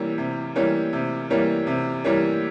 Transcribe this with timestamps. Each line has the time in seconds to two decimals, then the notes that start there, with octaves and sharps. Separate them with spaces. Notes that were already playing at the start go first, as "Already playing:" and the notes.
Already playing: C3 E3 G3 A#3 C#4
0.18 C3
0.56 E3 G3 A#3 C#4
0.93 C3
1.30 E3 G3 A#3 C#4
1.67 C3
2.04 E3 G3 A#3 C#4